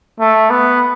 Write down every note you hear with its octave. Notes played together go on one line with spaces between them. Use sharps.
A3
B3